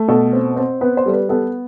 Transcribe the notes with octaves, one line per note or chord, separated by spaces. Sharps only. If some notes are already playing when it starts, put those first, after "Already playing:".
Already playing: A3
B2 A4
C4
C4
B3 B4
C5
G3 A4
B4
B3 A4